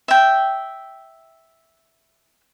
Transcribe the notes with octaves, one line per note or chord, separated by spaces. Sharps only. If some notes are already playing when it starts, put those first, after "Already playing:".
E5 G5